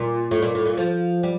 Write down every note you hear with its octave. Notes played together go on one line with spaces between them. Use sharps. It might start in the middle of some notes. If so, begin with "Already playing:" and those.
Already playing: A#2
A2
A#2
A2
A#2
F3
G3